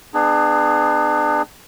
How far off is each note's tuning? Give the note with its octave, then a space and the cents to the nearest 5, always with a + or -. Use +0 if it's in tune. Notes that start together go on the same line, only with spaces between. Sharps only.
B3 +25 D4 +35 G#4 +0